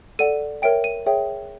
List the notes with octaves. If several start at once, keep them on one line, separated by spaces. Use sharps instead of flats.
A4 D5 F#5 D#7
A#4 C#5 E5 G5 D7
D#7
G#4 C#5 E5 G5